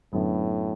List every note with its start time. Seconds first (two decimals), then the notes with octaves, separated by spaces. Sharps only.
0.13 F#2 A2 D3 F#3 B3